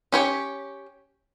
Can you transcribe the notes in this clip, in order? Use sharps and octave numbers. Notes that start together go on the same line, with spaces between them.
C#4 G4 C#5